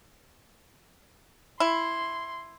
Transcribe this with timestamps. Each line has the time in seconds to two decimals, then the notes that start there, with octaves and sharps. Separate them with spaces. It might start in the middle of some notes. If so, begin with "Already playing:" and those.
1.60 E4 C6